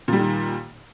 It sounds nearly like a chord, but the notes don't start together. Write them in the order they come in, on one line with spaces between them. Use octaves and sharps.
A#2 G3 D#3